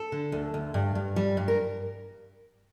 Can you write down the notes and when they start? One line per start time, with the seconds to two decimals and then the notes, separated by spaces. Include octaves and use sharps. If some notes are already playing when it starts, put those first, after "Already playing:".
Already playing: A4
0.12 D3
0.32 D2
0.54 D2
0.74 G2
0.95 G2
1.16 G3
1.37 G2
1.48 A#4